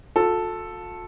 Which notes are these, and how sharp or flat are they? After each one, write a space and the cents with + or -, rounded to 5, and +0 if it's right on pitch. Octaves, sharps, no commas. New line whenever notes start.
F4 +45 A4 +0